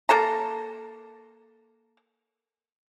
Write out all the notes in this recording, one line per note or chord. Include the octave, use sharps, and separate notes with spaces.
A#3 A4 A5 A#5